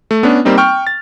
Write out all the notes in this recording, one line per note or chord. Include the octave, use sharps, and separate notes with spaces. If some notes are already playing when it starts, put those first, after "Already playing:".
A3
B3 C#4 D4
G3 A#3 C4 D#4
G5 C#6 F6
A6